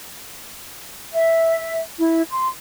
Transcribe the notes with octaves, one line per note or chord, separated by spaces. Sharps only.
E5
E4
C6